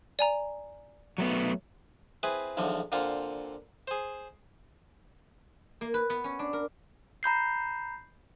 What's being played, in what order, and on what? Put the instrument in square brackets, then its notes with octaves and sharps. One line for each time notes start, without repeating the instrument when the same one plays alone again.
[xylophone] D5 G#5 A#5
[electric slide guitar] F#3 A3 B3
[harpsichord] C4 E4 G#4 B4
B1 E2 D3 F3
A#2 D3 C4 F4
G#4 C5
[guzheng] A#3
B4
B3
C#4
D4
A#4
[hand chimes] A#5 B5 G6 C7